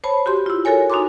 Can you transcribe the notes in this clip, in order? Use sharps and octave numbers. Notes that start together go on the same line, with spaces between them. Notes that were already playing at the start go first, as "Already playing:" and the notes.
C5 C#5 A5 B5
F#4 G4 C6
E4 F4
F#4 A4 A#4 C#5 G#5
D#4 F#4 G#5 A#5 C6 D6